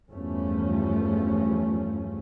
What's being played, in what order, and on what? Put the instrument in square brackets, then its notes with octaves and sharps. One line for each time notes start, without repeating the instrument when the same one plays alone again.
[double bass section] E2 G2 F3 A3 C#4